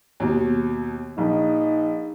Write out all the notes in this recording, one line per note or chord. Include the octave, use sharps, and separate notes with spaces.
D#2 B2
A#1 D#4